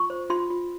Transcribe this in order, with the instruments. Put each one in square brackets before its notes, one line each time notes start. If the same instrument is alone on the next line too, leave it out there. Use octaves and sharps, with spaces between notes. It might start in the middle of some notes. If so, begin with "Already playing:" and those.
Already playing: [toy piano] F4 C#6
C5
F4 C6
F4